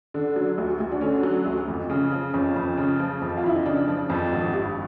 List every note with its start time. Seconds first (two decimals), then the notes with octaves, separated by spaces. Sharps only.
0.14 D3
0.36 F#3
0.58 D2
0.80 D2
0.92 D4
1.01 D3 C#4
1.23 F#3
1.46 D2
1.68 F2
1.90 C#3
2.12 F3
2.34 F2 C#4
2.56 F2
2.77 C#3
2.99 F3
3.22 F2
3.37 F4
3.44 F2 E4
3.56 D#4
3.66 C#3 D4
3.88 F3
4.10 F2
4.32 G#1
4.53 G2